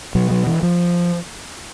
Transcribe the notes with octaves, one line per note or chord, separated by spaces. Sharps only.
B2 F#3
F#3
E3
F3